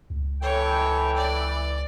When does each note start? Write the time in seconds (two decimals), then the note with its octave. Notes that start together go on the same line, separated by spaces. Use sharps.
0.10 C#2
0.42 E3 A4 C#5 G5
1.16 D5